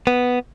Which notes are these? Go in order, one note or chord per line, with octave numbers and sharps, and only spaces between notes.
B3